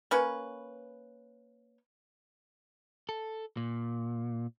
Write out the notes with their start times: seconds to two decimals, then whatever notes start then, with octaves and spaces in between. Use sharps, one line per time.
0.11 A#3 C#4 B4
3.09 A4
3.57 A#2